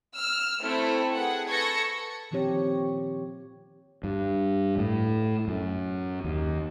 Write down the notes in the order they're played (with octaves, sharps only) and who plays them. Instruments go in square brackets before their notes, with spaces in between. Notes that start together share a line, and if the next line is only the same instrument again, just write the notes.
[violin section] E6 F6
A3 C4 E4 A4
G#4 B4 F#5
A4 B4 C#6 G#6 A#6 C#7
[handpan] A#2 D#3 F3 C4 G4 C#5
[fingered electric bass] G2
A2
F#2
D#2